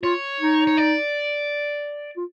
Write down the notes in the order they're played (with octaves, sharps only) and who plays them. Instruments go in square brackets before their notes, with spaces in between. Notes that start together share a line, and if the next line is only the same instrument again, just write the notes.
[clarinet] F4 [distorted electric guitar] C#5
[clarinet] D#4
[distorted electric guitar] C#5
D5
[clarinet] F4